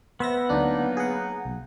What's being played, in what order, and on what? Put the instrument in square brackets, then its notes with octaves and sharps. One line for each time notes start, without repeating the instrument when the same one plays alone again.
[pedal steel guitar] B3 [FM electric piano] C5 E5 A#6
[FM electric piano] D2 D4 F#6 [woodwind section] F#3 A#3 D#4
[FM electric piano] G#4 F#5
B1